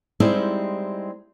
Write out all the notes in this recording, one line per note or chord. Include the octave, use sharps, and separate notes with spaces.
G3 G#3 C4 D#4 E4 G4